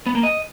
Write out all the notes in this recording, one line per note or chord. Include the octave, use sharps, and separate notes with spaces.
B3
A#3
D#5